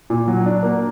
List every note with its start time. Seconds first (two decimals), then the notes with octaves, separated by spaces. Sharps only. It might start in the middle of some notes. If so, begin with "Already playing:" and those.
0.10 A#2
0.28 F#3
0.46 D4
0.63 A#3